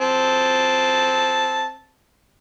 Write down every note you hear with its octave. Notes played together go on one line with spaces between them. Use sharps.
C4 A5